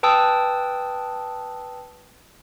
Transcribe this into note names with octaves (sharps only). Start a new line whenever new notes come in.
B4 G5 A5 D#6 E6